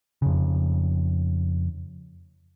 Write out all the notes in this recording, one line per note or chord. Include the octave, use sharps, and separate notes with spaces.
F2 C#3